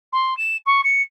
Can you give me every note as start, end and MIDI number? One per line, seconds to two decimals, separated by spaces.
0.12 0.36 84
0.37 0.57 100
0.66 0.81 85
0.84 1.02 97